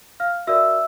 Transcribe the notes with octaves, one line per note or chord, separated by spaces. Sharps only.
F5 F6
F#4 A#4 D5 E5 E6